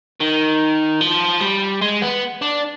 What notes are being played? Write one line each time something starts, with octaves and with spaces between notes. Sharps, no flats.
D#3
F3
G3
G#3
B3
D4